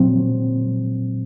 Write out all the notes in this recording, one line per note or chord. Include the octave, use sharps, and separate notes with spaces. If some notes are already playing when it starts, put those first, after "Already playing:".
Already playing: A#2 F#3 C4